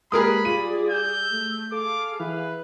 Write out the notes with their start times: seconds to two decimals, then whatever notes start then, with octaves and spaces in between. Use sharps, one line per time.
0.12 G3 G#3 A#3 G#4 A#4 B4 B5 D#6
0.45 G3 F4 G#4 D5 D#7
0.91 E6 G6
1.31 A3
1.72 G#4 A4 F5 D6
2.20 E3 B4